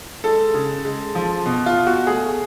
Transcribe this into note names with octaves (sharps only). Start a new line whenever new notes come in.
G#3 A4
C#3
G#3
F3
B2
F4
B2
F#4
A3 G#4